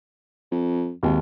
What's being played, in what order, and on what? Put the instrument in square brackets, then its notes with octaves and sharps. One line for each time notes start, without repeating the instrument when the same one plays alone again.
[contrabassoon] F2
[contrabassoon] G#1 [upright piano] D#2